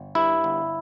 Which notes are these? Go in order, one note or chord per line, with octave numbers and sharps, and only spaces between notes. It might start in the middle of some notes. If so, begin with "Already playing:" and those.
Already playing: G1
G2 E4
G1